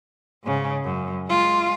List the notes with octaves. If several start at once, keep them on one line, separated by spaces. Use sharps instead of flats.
G#2 C#3
F#2
G#3 F4